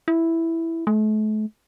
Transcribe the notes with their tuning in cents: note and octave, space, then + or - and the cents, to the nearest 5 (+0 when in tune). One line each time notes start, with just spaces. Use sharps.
E4 +0
A3 -40